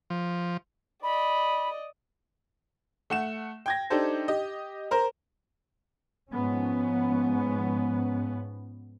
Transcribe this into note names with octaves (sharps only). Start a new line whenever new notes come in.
F3
D5 D#5 B5
A3 F#5 E7
G5 G#6 A#6
D4 D#4 G4 A4 C5
G4 D#5
A#4 C5 A#5
G#2 F3 B3 C#4